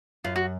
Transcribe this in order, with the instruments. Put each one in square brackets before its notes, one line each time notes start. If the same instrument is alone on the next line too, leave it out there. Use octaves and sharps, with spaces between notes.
[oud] F#2 [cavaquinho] F4
[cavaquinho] F#4